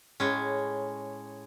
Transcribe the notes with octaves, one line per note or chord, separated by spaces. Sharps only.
A2 G#3 C#4